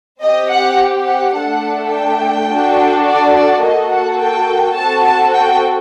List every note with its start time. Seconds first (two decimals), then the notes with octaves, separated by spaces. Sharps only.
0.21 C4 G4 D#5
0.50 F#5
1.06 F#5
1.35 A3 D4 A4 F#5
1.93 G5
2.49 D4 F#4 A4
3.07 D5
3.35 D5
3.63 A#3 F#4 A4 D#5
3.92 F#5
4.20 G5
4.77 C4 F#4 A4 A5
5.06 A5
5.34 G5